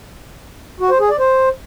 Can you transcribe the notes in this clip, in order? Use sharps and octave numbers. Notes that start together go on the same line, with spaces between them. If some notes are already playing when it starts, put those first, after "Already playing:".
F#4
C5
G#4
D5
C5